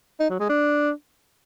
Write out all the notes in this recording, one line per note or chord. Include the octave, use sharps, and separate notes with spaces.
D#4
F#3
G#3
D4